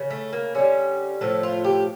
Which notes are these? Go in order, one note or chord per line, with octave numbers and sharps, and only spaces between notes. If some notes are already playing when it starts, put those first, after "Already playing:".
Already playing: C#3
A3
A#3
D3 G3 C#4
A2 F3 A3 A4
F4
G4